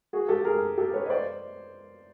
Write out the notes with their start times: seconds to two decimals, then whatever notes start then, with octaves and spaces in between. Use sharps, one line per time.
0.13 F#4 G#4
0.28 G4 A4
0.45 G#4 A#4
0.78 G4 A4
0.93 B4 C#5
1.06 D#5
1.09 C5 D5